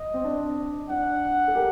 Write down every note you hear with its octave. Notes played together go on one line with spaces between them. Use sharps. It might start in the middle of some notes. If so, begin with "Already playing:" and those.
Already playing: D#5
C4
D4
D4 F#5
A4
G4 A#4